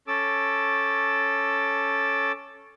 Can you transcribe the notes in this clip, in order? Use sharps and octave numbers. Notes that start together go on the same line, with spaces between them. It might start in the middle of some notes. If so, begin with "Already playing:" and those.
C#4 A4 D6 E6